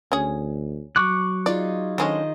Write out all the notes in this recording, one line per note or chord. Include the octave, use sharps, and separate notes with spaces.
D2 C#4 G#4
F#3 C#6 D6 F#6
D#4 F4 G#4 D5
D3 D#3 G#3 C#4 C5 D#5